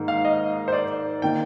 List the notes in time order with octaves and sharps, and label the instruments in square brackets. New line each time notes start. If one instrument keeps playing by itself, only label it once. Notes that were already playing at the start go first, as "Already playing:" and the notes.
Already playing: [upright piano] G#2 D#3 A#3
[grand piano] F5
D#5
C5
D5
[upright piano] D#3 A#3 [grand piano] G5